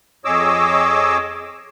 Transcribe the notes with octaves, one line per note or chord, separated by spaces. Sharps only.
F2 G#4 C#5 D#5 D6 E6